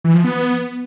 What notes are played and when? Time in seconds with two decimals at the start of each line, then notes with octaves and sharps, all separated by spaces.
0.04 E3
0.14 F3
0.24 B3